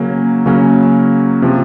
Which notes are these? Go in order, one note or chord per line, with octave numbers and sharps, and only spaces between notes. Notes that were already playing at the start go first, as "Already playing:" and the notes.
Already playing: C#3 F#3 A#3 C#4
C#3 F#3 A#3 C#4
C3 F3